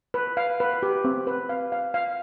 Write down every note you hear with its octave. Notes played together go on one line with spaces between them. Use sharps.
B4
F5
B4
G4
C4
B4
F5
F5
F5